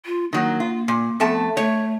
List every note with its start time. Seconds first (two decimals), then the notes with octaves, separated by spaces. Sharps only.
0.06 F4
0.33 D#3 F#3 A#3
0.60 F4
0.88 A#2
1.20 F2 A3 B3 A5
1.57 A3 C#5